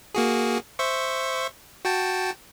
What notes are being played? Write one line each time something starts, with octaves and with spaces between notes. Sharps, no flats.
A#3 F#4 G#4
C5 E5 C#6
F#4 G5 A5